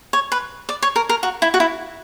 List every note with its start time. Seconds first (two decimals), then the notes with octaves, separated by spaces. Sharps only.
0.13 C#5
0.32 B4
0.69 D5
0.82 C#5
0.96 A#4
1.09 A#4
1.23 F#4
1.42 E4
1.54 F#4
1.60 E4